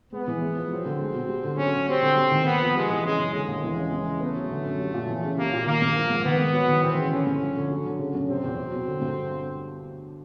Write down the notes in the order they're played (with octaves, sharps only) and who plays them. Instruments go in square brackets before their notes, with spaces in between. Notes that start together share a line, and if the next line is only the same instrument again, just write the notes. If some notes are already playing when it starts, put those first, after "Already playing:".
[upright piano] G#3 [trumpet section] B3
[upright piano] E3
G#3
F3
[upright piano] F#3 [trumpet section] C4
[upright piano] D3
G#3
B2
G3
D3
[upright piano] F#3 [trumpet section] C#4
[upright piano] D3
[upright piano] G3 [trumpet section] C4
[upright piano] D3
G3
D#3
[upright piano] A#3 [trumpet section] B3
[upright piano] F3
[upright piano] G3 [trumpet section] G#3
[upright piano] E3
[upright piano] C#3 [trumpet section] G#3
[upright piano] F#2
[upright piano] D3 [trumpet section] G#3
[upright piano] D#2
E3
C#3
E3
C#3
[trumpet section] A3 [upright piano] B3
[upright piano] F#3
D3
F#2
G3
A#2
E3
C#3
[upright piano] G3 [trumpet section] A#3
[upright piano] A#2
[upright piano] D#3 [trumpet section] A#3
[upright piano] G2
F3
G#2
[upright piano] D#3 [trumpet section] B3
[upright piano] G#2
F#3
D#3
[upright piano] E3 [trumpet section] C4
[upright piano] C#3
[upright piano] D3 [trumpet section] C#4
[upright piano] G2
F3
D3
F#3
D3
C#3
F#2
[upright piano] C3 [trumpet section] C4
[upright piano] E2
F#3
B2
D3
G2